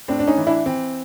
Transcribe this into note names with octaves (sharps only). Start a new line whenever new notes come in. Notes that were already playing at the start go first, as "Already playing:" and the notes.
A2 C4 D4
D4
C#4 D#4
E3
D4 E4
E3 C4